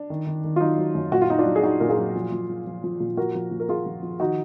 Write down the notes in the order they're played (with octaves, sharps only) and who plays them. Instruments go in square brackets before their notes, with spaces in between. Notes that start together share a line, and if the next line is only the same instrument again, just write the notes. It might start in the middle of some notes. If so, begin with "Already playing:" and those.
Already playing: [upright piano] D4
D#3
D#3
D#3
F4
F#3 D#4
F#3
F#2
A#2 F#4
F4
F#3 D#4
D4 F4
F#3
G#4
F#3 D#4 F#4
A#2 A#4
F4 G#4
F#3
F3
A#2
F3
F3
F3
A#2
F3 F#4 A#4
F3
A#2
A#4
A#2 F4 G#4
F3
F3
D#3 D#4 F#4